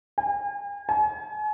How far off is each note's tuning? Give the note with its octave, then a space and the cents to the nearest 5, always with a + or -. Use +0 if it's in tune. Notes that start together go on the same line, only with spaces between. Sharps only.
G#5 -45
G#5 +40